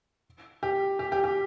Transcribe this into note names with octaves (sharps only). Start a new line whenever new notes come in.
G4
G4
G4
G4